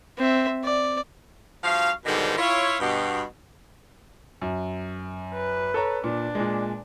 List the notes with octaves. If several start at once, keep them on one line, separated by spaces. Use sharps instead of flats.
C4 E5
D5
G2 F3 F#4 F5
G#2 B2 D3 D#3 F3 G3
E4 F4 C#5
G2 B2 G4
F#2
B4
A4 C#5 A#5
A#2 D4
A#2 G#3